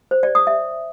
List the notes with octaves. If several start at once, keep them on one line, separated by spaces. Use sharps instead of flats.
C5
D5
D#6
E5